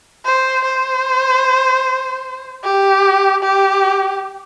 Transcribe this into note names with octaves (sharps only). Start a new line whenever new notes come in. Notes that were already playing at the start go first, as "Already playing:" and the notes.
C5
C5
G4
G4